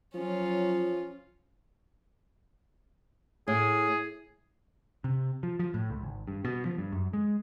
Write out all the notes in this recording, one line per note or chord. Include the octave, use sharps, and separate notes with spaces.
F3 F#3 C#4 F4
A2 G#4
C3
F3
F3
A2
C#2
G#1
G2
B2
F3
G2
F#2
G#3